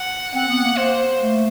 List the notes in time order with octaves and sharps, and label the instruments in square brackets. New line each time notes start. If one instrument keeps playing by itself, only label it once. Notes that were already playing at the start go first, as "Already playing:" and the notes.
Already playing: [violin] F#5
[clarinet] C4 [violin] F#5
[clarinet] B3
A#3
[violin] C5
[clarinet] A3